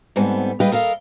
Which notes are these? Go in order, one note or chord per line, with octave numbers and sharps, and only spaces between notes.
G#2 G3 B3 C4 A4 G#5
G3 G#4 B4 D#5 F5 G5
A4 A#4 D#5 F5